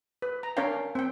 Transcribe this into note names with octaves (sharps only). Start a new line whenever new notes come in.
B4
A#5
C#4 D4 A#4 C#5 F5 G5
C4 G5